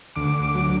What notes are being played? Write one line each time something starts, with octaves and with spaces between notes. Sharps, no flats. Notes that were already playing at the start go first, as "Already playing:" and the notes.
D2 D6
F#3